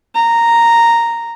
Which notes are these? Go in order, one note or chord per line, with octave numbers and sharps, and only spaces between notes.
A#5